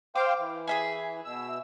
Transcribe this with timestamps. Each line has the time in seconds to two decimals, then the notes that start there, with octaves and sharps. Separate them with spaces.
0.16 C5 F5 G5 D6
0.39 E3
0.67 G#4 E5 G#5
1.25 B2 E6